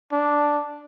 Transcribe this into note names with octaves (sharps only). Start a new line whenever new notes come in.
D4